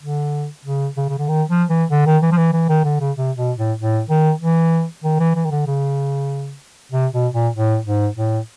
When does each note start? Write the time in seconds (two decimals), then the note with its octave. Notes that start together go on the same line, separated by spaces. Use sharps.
0.03 D3
0.65 C#3
0.97 C#3
1.09 C#3
1.18 D3
1.28 D#3
1.49 F3
1.70 E3
1.91 D3
2.06 D#3
2.22 E3
2.32 F3
2.37 E3
2.53 E3
2.69 D#3
2.85 D3
3.00 C#3
3.16 C3
3.37 B2
3.58 A2
3.78 A2
4.10 D#3
4.41 E3
5.04 D#3
5.20 E3
5.36 E3
5.45 D#3
5.51 D3
5.67 C#3
6.92 C3
7.13 B2
7.34 A#2
7.55 A2
7.86 G#2
8.17 A2